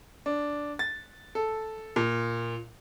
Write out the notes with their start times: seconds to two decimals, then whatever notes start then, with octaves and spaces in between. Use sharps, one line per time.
0.26 D4
0.79 A6
1.35 A4
1.96 A#2